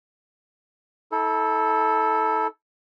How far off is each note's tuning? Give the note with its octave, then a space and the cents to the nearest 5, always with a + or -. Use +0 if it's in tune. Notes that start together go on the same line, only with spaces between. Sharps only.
E4 -40 A4 -5